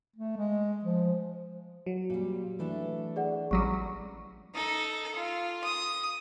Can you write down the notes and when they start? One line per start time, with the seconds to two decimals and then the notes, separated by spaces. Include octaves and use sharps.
0.16 A3
0.37 G#3
0.85 F3
1.86 F#3
2.10 A#2 G3
2.59 E3 A3 D4
3.16 G#4 D5 F#5
3.51 A1 F#3 G3 C#6
4.54 D#4 A4
5.15 F4
5.64 D#6